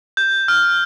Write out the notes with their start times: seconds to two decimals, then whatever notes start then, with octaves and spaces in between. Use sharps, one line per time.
0.17 G6
0.48 F6